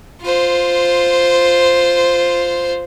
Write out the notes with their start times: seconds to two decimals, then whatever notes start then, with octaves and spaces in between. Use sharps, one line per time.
0.22 F4 C5